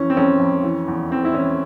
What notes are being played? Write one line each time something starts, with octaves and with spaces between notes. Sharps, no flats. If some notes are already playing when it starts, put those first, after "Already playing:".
Already playing: F2 E3 C#4
C4
F2 C#4
F2
E3
E2
E3 C4
E4
E3 C#4